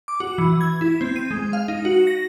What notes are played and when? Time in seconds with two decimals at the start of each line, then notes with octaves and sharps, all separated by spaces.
0.08 D6
0.20 F#4
0.38 E3
0.61 G#6
0.81 E4
1.01 C4
1.16 D#7
1.31 G#3
1.53 F5
1.68 D#4
1.85 F#4
2.07 A#6